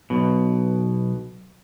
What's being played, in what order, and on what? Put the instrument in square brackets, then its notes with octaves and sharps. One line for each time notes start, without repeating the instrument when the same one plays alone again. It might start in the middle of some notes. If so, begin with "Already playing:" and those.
[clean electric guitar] B1 B2